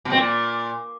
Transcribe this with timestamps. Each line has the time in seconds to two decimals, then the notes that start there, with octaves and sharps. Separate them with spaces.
0.05 B2
0.11 C4
0.18 A#2